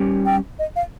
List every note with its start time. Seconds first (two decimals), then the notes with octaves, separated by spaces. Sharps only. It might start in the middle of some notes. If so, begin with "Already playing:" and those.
Already playing: G3 C#4 G4
0.26 G5
0.59 D#5
0.76 F5